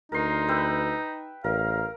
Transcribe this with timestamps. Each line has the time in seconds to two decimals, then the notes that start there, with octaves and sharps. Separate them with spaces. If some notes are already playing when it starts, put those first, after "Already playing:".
0.12 D2 D#4 A#4 C6
0.49 B4 E5 G5
1.44 A1 A#4 F5